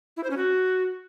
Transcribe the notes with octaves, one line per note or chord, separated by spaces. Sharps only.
E4
C5
C#4
F#4